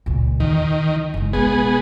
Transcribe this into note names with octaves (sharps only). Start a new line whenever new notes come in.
C#2 A#2
E2 D#3
F#1 G#2
B1 G#3 B3 G#4